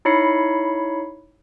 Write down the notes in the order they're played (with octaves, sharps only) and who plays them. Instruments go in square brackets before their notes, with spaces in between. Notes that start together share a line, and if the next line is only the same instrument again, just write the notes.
[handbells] D#4 E4 C#5 B5 C7 C#7